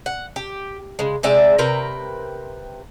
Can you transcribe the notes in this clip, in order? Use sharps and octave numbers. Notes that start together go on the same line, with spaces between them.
F#5
G4
C#3 G#3
C3 G#3 D5 E5
C3 A#4 B4 G5